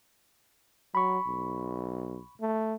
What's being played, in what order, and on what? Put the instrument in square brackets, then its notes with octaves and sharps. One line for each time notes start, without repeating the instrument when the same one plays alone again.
[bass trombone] F#3 [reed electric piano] B5 C#6
[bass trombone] B1
A3